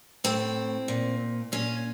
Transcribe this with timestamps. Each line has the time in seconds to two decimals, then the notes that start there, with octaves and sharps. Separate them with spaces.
0.24 A2 C4
0.88 A#2
1.52 A#2 C#4